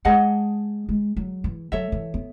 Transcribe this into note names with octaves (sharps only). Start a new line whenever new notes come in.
G#3 G#4 D#5 F#5 A5
G#3
F#3
E3
F#3 A4 C#5 E5
E3
B3